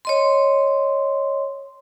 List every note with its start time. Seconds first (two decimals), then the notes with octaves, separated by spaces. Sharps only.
0.05 C#5 D#5 C6